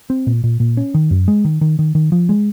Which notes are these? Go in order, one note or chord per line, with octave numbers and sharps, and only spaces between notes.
C4
A#2
A#2
A#2
C#4
D#3
F#2
G#3
D#3
D#3
D#3
D#3
F3
G#3